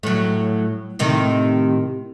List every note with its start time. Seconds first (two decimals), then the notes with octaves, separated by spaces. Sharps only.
0.03 A2 F#3
0.99 A2 C3 D#3